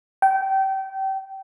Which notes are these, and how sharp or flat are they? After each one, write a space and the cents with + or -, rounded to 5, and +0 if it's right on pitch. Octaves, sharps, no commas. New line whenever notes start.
G5 -25